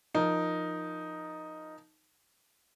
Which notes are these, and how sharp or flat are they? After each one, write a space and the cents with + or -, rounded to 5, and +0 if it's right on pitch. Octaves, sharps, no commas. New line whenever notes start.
F3 +0 D#4 +0 A#4 +5